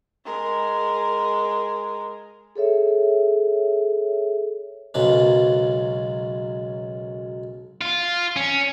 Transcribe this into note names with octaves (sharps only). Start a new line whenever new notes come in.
G#3 A#4
G#4 A4 C#5 E5
B1 F#2 C#3 G#3 B4
F4
C#4